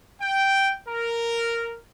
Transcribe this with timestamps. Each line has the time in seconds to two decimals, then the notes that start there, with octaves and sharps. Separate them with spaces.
0.20 G5
0.87 A#4